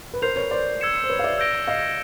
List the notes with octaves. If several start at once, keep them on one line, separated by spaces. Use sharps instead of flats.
B4
A#4 C5 G6 C7 F7
B4 C#5
C5 D5
E6 G#6 C#7 E7
C5
B4 C#5
F5
D5 E5
E6 G6 A#6 D7 G7
D#5 F5